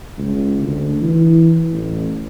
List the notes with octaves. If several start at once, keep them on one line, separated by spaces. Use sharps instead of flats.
C#2
D2
E3
A1